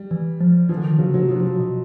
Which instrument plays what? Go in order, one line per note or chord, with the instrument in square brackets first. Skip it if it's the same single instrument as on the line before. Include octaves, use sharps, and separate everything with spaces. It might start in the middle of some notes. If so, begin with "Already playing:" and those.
Already playing: [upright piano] G3
[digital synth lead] E3
F3
[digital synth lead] E3 [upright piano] F3
[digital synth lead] D3
D#3
[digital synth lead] C#3 [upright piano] F#3
[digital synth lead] C3 [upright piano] F#3
[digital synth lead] C3 [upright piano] F3
[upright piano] F#3
F3
[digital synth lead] B2